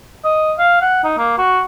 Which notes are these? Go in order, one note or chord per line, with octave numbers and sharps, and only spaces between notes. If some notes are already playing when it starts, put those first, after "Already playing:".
D#5
F5
F#5
D#4
A#3
F#4